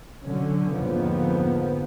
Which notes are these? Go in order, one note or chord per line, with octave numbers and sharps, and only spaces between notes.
D3 F#3 C#4
F2 G#2 D3 F3 A#3 B3